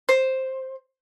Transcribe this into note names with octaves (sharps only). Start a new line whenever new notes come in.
C5